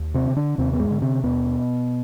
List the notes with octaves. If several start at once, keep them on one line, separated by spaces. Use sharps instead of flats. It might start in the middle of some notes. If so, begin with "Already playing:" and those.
Already playing: D#2
C3 C4
D3
D3 D4
D#2 C3 C4
B3
G#2 G#3
D3
C3 C4
D#2 B2 B3